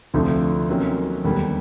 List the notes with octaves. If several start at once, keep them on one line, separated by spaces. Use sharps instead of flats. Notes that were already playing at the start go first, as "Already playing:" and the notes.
D2 C3 F3 A3 D4
C3 D#3 F#3 A#3 C#4
D#2 D3 G3 B3